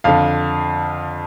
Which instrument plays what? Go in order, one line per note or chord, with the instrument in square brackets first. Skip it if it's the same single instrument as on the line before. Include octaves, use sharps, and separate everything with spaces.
[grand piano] F2 D3 F5